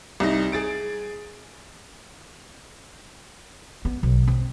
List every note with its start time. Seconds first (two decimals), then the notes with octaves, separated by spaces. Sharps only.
0.20 C2 D#4
0.52 G#4 A6 D7
3.85 B3
4.03 B1
4.27 C4